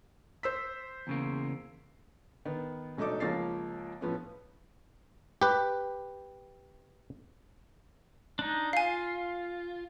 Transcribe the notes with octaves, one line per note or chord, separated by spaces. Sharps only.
C5 E6 B6
E2 C#3 A#3
D#3 B3
E1 F#3 A3 D#4 A4 D6
C#2 F3 A#3 C#5 A6 C7
A2 F3 B3 C#4
G4 B4
D4 D#4
F4 F5 G#5